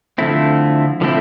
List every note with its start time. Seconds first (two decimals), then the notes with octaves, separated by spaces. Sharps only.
0.18 D3 F3 A3 C4 E4
1.01 D3 F3 A3 C4 E4